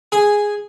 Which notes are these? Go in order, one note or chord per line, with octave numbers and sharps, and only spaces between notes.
G#4